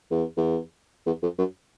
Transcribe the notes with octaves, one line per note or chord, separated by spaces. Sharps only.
E2
E2
E2
F2
F#2